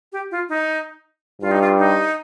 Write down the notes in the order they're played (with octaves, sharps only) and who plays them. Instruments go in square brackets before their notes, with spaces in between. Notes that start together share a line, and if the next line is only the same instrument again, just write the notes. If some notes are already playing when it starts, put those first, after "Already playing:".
[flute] G4
F4
D#4
[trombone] G2 [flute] F4
[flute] D#4
F4
D#4